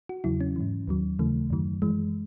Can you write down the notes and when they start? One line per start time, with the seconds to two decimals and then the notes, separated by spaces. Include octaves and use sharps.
0.09 F#4
0.24 E2 C#3 F#3 E4
0.41 C#4
0.56 G#2 E3
0.88 D#2 D#3 F#3
1.19 D#2 C#3 E3 A3
1.50 F#2 D#3 F#3
1.82 F#2 E3 G#3